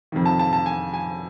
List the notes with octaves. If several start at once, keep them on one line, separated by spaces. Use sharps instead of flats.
F2 C3 D#3
A5
A5
A5
G#5
G#5